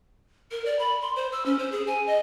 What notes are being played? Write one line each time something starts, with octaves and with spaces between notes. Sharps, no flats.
A#4
D5
B5
C6
C5
E6
C#4
C5
G#4
G#5
D#5